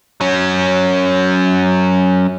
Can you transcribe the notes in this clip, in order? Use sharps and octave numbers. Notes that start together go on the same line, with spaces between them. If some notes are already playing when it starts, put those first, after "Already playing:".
F#3 C#4